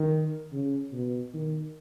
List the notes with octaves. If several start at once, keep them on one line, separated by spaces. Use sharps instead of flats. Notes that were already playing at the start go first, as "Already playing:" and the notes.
Already playing: D#3
C#3
B2
D#3